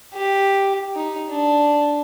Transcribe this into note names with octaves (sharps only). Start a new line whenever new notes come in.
G4
D#4
D4